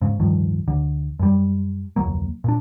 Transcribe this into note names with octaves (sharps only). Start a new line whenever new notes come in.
G#2 C#3
D1 G2 D#3 F3
D2 D3
F#2 G3
F1 D2 F#3 A#3
A#2 D4